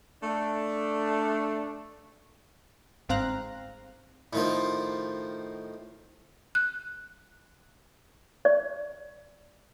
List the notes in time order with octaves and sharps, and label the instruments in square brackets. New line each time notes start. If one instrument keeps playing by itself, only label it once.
[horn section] A3 D4
[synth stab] G1 G#2 C4 F5 A#5 F#6
[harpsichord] A2 D#3 F3
[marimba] F#6
[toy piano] D5